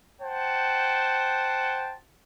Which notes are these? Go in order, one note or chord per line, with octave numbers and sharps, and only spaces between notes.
C5 F#5 G5 A5